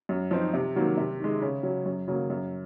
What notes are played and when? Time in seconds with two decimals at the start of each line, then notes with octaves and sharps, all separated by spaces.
0.09 F#2
0.31 F3 C4 D#4
0.54 C3
0.75 D#3 F#3 A#3
0.97 C3
1.20 D#3 G#3
1.42 C#3
1.63 F#3 C#4
1.86 F#2
2.08 C#3 F#3 A#3
2.30 F#2